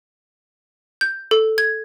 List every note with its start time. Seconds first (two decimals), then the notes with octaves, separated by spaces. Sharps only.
1.01 G6
1.31 A4
1.58 G#6